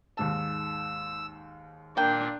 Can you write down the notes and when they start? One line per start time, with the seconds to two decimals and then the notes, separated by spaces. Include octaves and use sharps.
0.17 D#2 G#2 A5 E6
1.97 A#2 A#3 D4 G5